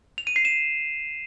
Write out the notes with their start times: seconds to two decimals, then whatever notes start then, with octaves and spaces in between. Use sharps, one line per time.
0.18 F7
0.27 D#7
0.36 C7
0.45 E7